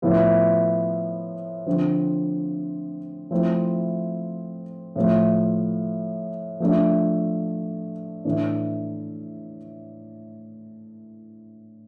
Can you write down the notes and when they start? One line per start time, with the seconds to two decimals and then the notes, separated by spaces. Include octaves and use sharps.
0.02 A2 F3 B3 E4
1.66 D3 F3 C4
3.31 F3 A3 C4 E4
4.96 A2 F3 A3
6.60 F3 A3 D4
8.25 A2 E3 A3 D4